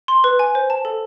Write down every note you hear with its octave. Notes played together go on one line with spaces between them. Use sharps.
C6
B4
G#5
C5
A5
A4